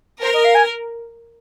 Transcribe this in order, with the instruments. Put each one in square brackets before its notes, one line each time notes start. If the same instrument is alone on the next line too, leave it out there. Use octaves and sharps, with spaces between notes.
[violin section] A#4 [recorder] C5
[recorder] D#5
F5
G#5